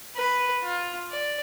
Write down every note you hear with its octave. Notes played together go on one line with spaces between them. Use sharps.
B4
F4
D5